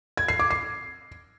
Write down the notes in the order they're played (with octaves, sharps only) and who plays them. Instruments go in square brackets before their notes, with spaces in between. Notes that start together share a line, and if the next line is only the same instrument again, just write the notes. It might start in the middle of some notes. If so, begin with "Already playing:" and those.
[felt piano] G#6
C7
D6
C7